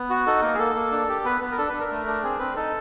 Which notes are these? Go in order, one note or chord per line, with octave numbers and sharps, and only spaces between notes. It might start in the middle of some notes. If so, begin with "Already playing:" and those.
Already playing: B3
F#4
D#4 A4
A#3 A#4
G#4
A#3 A4
A#3
D4
G4
B3 B4
B3
A#4
D4 A4
D4 B4
A#4
A3
D4
C4 G#4
C4 B4
D#4 A4